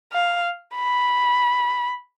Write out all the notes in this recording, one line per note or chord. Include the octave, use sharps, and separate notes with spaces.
F5
B5